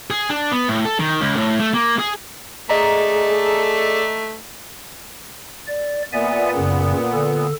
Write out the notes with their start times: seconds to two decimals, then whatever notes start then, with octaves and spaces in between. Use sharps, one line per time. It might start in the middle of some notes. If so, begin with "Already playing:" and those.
0.10 G#4
0.30 D4
0.52 B3
0.68 A2
0.85 A4
0.99 D#3
1.21 C#2
1.37 A2
1.60 A3
1.74 A#3
1.99 G#4
2.69 A3 G#4 A4 D5 D#5 A#5
5.67 D5
6.13 A#2 B3 D5 E5 G#5
6.56 F#2 C#3
7.13 D3 A4